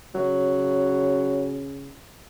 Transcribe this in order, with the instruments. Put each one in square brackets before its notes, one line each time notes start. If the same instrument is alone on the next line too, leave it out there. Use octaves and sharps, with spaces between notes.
[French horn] C#3 [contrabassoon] F#3